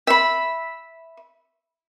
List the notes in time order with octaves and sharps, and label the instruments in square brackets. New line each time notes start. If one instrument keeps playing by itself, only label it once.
[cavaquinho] E5 B5